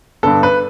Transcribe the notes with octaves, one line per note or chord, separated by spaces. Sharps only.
G2 D3 B3 A4
B4